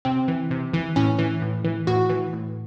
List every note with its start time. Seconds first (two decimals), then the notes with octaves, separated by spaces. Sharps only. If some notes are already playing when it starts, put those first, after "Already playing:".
0.05 C3 C4
0.28 E3
0.51 C3
0.74 E3
0.96 A2 C#4
1.19 E3
1.42 A2
1.65 E3
1.87 A2 F#4
2.10 E3
2.33 A2